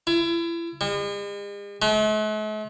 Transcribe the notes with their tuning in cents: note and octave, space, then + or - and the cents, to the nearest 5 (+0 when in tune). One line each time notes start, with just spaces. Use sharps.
E4 +35
G#3 -45
A3 -45